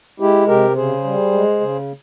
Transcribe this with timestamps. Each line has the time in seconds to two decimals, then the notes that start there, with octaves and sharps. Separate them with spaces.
0.20 G#3 E4 G4
0.48 C3 G4 A#4
0.76 C#3 G#4 C5
1.04 G3
1.32 G#3
1.61 C#3